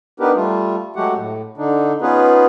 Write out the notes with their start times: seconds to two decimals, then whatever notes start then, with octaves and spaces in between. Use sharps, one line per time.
0.20 B3 D4 D#4 G4 A#4 B4
0.35 G3 A3 F4
0.96 F#3 G#3 A3 F#4 G4 F#5
1.16 A2
1.57 D3 D4 D#4
2.01 B3 C#4 D#4 F4 G#4 B4